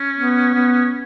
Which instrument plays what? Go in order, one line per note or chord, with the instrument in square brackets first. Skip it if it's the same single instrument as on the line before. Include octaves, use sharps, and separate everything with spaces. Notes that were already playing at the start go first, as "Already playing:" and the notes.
Already playing: [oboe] C#4
[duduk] B3
B3